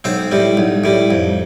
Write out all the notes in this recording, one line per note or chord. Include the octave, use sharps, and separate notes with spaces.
B1 C4 C5
A2 G3
B1
A2 G3
F2